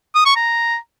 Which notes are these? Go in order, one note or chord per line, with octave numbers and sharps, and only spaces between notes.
D#6
C#6
A#5